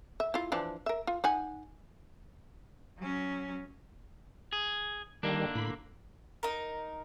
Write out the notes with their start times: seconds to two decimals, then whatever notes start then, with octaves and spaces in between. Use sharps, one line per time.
0.20 E5
0.34 E4 F4
0.52 E3 F3 D4
0.86 A#4 E5
1.07 F4
1.24 D#4 F#5 G#5
2.98 F#3 C#4
4.53 G#4
5.23 D3 D#3 G3 A#3 D4
5.55 A2 B5
6.43 D#4 A#4